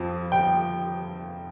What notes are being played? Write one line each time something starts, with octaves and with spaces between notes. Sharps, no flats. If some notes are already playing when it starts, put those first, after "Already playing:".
Already playing: F2 F3 C4
G5